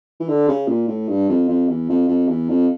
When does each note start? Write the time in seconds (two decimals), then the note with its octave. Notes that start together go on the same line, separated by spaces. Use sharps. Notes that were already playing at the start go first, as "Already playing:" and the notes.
0.20 E3
0.29 D3
0.49 C#3
0.68 A#2
0.88 A2
1.08 G2
1.29 F2
1.49 F2
1.69 E2
1.89 F2
2.09 F2
2.29 E2
2.49 F2